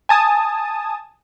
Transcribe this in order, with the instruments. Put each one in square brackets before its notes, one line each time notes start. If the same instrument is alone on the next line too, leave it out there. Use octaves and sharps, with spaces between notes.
[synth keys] G#5 A5 D#6